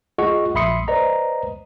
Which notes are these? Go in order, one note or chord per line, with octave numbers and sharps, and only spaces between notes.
F4 G#4 D#5 F#5 C#6
A#1 E5 B5 C6 D#6 C#7
B4 C5 D5 D#5 A#5